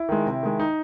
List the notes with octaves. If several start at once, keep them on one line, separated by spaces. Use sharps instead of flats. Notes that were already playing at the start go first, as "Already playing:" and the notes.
Already playing: E4
D#3 G#3
C3
D#3 G#3
D#4